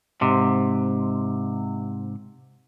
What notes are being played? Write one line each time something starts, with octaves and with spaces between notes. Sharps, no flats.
G#2 C3